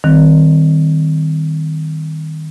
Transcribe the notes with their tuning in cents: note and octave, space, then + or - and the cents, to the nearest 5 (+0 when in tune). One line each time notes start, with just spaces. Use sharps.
D#3 +0 G3 -15 C4 +0